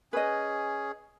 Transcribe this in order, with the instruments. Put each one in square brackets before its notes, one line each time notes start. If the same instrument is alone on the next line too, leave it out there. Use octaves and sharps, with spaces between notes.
[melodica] C#4 G#4 [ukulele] B4 D#5